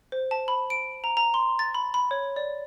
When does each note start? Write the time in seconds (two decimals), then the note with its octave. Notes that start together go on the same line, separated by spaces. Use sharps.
0.12 C5
0.31 A5
0.48 B5
0.70 D7
1.04 A#5
1.17 A#5
1.34 C6
1.59 A6
1.75 B5
1.94 B5
2.11 C#5
2.36 D5